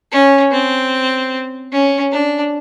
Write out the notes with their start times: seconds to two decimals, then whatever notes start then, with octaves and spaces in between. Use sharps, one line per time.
0.12 C#4
0.52 C4
1.72 C#4
2.12 D4